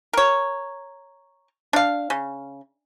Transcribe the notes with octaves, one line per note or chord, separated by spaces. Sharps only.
A#4 C#5
D4 F5
C#3